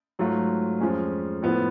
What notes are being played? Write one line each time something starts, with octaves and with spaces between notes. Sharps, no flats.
G#2 F#3 A3 F4
F2 F3 G#3 C#4
A2 F3 B3